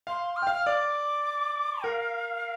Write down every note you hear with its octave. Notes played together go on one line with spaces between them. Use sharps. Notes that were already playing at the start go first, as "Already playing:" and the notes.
F5 C6
F6
G5
F5
F6
D5 D6
A#4 F5